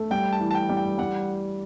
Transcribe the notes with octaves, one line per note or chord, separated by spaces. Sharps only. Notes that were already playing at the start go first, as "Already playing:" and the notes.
Already playing: A3
G3 G5
A5
E3
A5
G5
G3
G5
G3 F#5